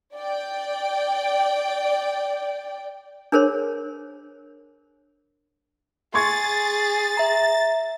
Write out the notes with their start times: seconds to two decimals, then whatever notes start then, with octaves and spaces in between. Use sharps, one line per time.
0.14 D5 G5
3.32 D4 G#4 A#4 C5 C#5 C6
6.14 G#4 C6 C#6 G#6 A6
7.17 E5 A#5